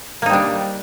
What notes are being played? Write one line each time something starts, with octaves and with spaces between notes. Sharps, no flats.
G3 A#3 D4 D#4